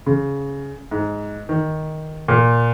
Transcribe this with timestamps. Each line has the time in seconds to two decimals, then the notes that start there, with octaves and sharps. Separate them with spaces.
0.06 C#3
0.91 G#2
1.49 D#3
2.28 A#2